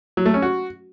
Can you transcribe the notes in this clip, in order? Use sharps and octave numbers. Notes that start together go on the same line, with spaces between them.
F#3
A3
C#4
F#4